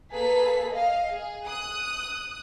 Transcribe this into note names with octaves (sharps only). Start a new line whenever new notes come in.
A#3 G#4 A4 B4 B6
D#5 F5
G#4
D#6 F#6